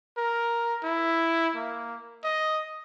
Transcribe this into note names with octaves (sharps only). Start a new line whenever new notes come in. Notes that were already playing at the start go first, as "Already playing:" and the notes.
A#4
E4
A#3
D#5